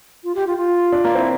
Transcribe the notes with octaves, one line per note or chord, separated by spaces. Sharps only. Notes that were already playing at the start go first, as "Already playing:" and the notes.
F4
G4
F4
F4
D4
A#3
C4 E4